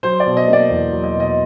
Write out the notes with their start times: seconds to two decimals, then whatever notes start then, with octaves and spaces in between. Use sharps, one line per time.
0.03 F#3 C5
0.20 D5
0.26 B2
0.37 D#5
0.48 A#3
0.53 D5
0.70 E2
0.92 F#3
1.03 D#5
1.15 B2 D#5